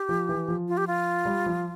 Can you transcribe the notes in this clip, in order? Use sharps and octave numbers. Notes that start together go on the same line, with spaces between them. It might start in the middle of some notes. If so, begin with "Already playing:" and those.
Already playing: G4
F3
E3
F3
F4
G4
F4
G3
F3